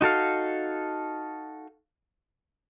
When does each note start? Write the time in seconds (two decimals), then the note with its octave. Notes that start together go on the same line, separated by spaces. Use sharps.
0.01 D#4 F#4 A4 F5